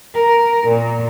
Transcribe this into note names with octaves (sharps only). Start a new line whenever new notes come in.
A#4
A#2